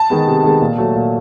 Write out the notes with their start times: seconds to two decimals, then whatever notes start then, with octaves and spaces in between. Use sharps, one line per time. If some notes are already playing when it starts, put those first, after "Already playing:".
Already playing: A5
0.10 D#3 G#3 B3
0.27 C3
0.44 D#3 G#3 B3
0.61 A#2
0.78 F#3 A3
0.95 A#2